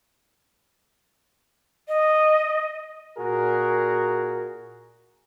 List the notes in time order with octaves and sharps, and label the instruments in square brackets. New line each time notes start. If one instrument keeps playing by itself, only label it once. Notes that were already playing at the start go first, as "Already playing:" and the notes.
[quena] D#5
[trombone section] A#2 F#4 G#4 A#4